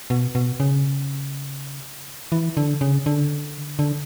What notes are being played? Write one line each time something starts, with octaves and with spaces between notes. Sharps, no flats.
B2
B2
C#3
E3
D3
C#3
D3
D3